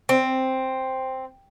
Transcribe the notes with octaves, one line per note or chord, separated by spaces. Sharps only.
C4